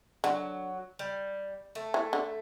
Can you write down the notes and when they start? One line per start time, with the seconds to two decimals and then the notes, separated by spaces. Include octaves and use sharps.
0.24 D3 F#3
0.99 G3
1.75 A3
1.94 E3
2.13 D3